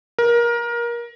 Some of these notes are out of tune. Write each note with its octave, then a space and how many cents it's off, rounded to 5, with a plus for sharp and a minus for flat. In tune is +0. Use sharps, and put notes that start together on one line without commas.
A#4 +20